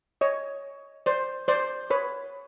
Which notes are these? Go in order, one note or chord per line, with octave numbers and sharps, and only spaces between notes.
C#5 D#5
C5 D5
C5 D5
B4 C#5